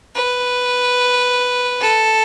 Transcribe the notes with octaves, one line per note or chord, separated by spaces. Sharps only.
B4
A4